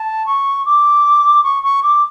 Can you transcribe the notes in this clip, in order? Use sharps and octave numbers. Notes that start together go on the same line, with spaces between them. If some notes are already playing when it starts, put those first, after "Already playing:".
Already playing: A5
C#6
D6
C#6
C#6
D6